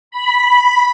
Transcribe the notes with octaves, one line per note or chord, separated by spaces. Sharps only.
B5